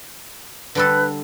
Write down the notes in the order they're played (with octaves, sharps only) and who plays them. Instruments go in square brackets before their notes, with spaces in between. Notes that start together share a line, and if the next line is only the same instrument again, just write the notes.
[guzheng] D3 G3 A4 [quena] B4